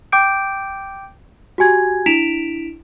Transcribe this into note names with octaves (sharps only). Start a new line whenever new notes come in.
G5 D6 G6 D7
F#4 G4 G#5 G#6
D4 E4 B6 D7 E7 F7